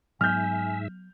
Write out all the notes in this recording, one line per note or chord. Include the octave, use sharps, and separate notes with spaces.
G#2 F#3 B3 E5 G#5 F6 G6